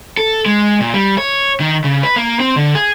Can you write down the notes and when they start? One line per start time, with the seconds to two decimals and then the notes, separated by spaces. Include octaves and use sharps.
0.17 A4
0.46 G#3
0.80 A#2
0.94 G3
1.18 C#5
1.60 D#3
1.84 C#3
2.03 B4
2.16 A#3
2.40 C4
2.56 D3
2.75 G#4